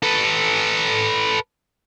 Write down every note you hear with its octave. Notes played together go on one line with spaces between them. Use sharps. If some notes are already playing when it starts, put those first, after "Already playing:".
A4 B4